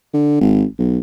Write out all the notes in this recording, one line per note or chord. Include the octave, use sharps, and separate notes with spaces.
D3
G#1
B1